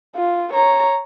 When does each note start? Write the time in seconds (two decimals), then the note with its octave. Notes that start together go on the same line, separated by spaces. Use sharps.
0.16 F4
0.53 C#5 A#5